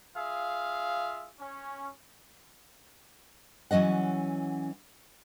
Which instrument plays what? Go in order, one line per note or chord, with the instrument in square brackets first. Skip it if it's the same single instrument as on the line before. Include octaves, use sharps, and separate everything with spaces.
[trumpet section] F4 G#4 E5 F5
C#4
[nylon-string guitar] E3 F#3 C#4 D#5 F#5